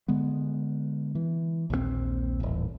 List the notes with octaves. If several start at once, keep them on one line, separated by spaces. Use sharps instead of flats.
D3 G#3 B3
E3
A#1 D#2 F#3 C4
D#1 A1